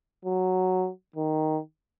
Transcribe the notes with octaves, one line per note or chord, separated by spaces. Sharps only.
F#3
D#3